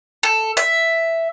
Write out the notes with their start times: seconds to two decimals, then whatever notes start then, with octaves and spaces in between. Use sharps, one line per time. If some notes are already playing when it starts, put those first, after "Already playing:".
0.23 A4
0.57 E5